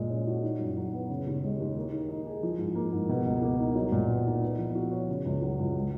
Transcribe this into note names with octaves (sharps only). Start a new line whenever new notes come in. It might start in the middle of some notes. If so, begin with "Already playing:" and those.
Already playing: A#2 G#3
C#4
F#4
D#3
F#2
F#3
B3
C#3
D#2
G#3
D#2
A#3
D#3
D#4
G#4
F3
G#2
A#3
G#2
B2
C#2
A#3
D#4
F#3
A#2
B3
D#4
B3
F3
F#4
C#5
C#3
C#2
F#3
C#2
G#3